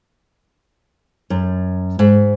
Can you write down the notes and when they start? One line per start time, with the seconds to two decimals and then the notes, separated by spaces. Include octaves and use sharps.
1.30 F#2
1.99 G#2